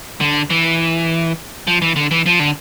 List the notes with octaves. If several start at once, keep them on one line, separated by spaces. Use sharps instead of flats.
D3
E3
F3
E3
D3
E3
F3
D3